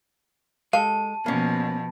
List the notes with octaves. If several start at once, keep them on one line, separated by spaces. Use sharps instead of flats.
G#3 G4 A4 F5 A5
B2 F3 A#3 C#4